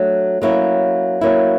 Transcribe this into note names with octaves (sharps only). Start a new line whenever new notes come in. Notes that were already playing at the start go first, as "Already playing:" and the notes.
Already playing: F#3 A3 D4
F#3 A#3 C#4 E4
F#3 A#3 C#4 E4